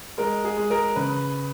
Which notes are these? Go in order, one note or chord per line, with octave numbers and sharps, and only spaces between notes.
G#3 A#4
G#4
G#3
A#4
C#3 B4